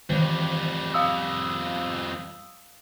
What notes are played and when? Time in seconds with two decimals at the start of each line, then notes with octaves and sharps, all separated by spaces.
0.10 F2 D#3 E3 G3
0.94 F5 D#6 E6